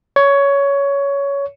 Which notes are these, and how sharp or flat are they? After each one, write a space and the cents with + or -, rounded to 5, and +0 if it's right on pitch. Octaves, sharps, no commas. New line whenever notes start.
C#5 +15